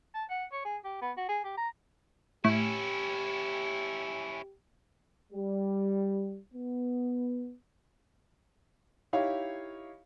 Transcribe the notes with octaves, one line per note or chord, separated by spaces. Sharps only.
A5
F#5
C#5
G#4
G4
B3
F#4
G#4
G4
A#5
A2 C#4 E4 G4
G3
B3
D#4 E4 G4 C#5 F5